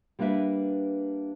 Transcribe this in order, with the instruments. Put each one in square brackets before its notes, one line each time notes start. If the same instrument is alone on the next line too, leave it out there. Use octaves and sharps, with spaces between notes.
[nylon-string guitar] G3 A#3 D4 B4 E5